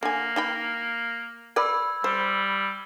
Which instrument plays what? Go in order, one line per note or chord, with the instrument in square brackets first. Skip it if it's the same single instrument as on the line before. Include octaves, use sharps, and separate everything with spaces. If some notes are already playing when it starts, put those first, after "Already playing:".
[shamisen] D3 G#5 [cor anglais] A#3
[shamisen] D#4 G5 B5
[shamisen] A#4 B4 D5 [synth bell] B5 E6 G#6
[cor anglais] G3 [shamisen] C5